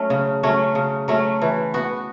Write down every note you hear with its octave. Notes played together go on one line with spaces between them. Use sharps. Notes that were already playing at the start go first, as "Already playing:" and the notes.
Already playing: F#3 A3 C#4
C#3
F#3 A3 C#4
C#3
F#3 A3 C#4
E3
B3 F#4